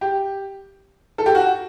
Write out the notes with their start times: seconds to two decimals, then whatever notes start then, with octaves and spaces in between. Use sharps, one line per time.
0.01 G4
1.18 A4
1.26 G4
1.35 F#4